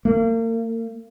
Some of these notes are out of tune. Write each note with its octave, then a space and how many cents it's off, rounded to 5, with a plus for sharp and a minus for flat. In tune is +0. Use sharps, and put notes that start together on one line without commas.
A#3 -40